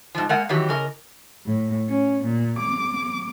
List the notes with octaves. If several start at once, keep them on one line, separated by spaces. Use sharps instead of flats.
G#2 F3
G#3 A#3 F#5
D#3 E3 F#3 G4
C#3 A#4 D#5
A2
C#4
A#2
D6